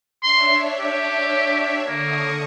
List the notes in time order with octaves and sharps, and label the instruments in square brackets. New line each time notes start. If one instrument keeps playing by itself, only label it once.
[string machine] D4 C#5 E5 [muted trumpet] C6
[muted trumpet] G4
[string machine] D3 C#6 D#6 [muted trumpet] A#3